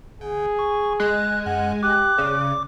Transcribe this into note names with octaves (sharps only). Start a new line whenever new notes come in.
G1 G#4
C#6
G#3 F#6
F#2 F#5
G4 D6 F#6
C#3 D5